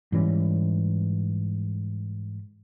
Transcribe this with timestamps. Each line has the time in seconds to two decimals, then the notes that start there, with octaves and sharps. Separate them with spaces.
0.12 G#2 E3 G3 C#4